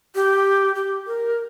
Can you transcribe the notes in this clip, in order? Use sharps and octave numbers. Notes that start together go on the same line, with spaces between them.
G4
G4
A#4